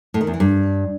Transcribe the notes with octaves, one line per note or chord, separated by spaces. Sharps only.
A2
D#3
E2
E3
G2